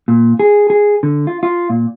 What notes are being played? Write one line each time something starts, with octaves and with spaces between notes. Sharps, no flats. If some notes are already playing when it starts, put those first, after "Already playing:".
A#2
G#4
G#4
D3
F4
F4
A#2